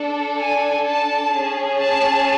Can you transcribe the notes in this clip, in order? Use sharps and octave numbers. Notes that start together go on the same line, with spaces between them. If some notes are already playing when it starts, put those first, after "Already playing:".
Already playing: D4 A4
G#5
A5
C#4 G#4
A5